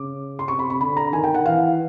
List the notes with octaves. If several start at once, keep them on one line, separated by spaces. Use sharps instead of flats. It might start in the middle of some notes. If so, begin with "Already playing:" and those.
Already playing: C#3 D6
C6
C3 C#6
B5
B5
D3 B5
A#5
D#3 G#5
G5
F#5
E3 F5